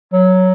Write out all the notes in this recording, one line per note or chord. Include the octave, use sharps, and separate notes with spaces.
F#3